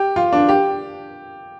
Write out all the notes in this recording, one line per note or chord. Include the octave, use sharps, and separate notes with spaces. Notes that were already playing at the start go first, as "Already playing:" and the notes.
Already playing: G4
F4
D4
G4